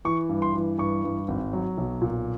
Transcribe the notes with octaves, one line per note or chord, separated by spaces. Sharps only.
E3 C#6
G2
C6
E3
G2 C#6
G2
G#1
F#3
B1
A#2